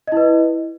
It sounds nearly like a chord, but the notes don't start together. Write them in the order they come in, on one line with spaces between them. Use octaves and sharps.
D#5 E4 B4